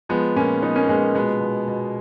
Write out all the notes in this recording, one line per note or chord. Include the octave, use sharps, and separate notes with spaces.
F3 G#3 B3
A#2 A#3 C#4
F3 B3 D#4
A#3 C#4
A#2 G#3 B3
A#3
B2 G#3 B3
B2
B2